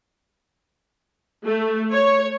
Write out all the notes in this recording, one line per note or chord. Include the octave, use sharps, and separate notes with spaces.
A3
C#5